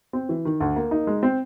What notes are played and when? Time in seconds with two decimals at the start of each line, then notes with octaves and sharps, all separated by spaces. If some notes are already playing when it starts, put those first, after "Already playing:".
0.13 C4
0.29 E3
0.45 D#3
0.60 D2
0.76 A#3
0.91 D#4
1.07 G#3
1.23 C4